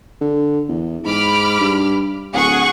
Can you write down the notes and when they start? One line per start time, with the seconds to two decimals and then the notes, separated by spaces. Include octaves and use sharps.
0.21 D3
0.69 E2
1.06 G#2 B5 D6 F6
1.60 G2
2.34 D1 G#4 F#5 C#6